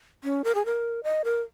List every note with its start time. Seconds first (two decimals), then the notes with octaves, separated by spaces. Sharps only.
0.24 C#4
0.44 A#4
0.55 G#4
0.65 A#4
1.04 D#5
1.25 A#4